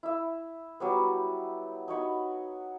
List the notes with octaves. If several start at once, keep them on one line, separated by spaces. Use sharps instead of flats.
E4 E5
F#3 G3 B3
D#4 F#4 C#5 B5